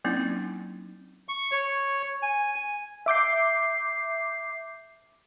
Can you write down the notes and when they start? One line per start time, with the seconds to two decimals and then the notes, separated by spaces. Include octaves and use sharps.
0.04 F#3 A#3 C4 C#4 D#4 E4
1.29 C#6
1.51 C#5
2.22 G#5
3.06 E5 D6 G6 C7